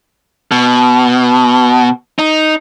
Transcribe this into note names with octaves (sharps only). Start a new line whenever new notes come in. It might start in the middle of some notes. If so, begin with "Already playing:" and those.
B2
D#4